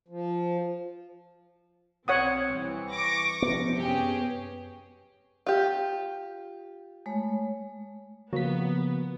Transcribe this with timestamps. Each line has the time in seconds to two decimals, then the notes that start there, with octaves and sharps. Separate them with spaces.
0.08 F3
2.08 B1 C4 C#5 F#5 D#6
2.53 C2 E3
2.92 C#6 D6 A#6
3.42 E2 C3 F3 B3
3.77 F#2 C#4 G4 G#4
5.46 F4 G4
7.06 G#3 A3 C#5
8.33 C#3 F3 F#3 A#3 B3 B6